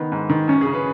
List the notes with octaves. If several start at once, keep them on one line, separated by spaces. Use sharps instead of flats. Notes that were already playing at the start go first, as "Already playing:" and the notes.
Already playing: D#3 B3
G#2
D#3
F#2 C#4
G#4
C#3
B4